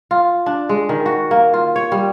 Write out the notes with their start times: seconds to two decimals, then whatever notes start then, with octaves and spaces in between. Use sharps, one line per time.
0.11 F4
0.46 D4
0.69 G#3
0.89 D#3
1.06 F#4
1.31 A#3
1.54 F4
1.76 C#5
1.92 G3